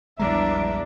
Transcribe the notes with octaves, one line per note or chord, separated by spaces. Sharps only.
A#1 E2 G3 G#3 D4 E5 A#5